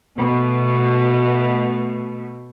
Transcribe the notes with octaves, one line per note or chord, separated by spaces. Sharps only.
B2 A3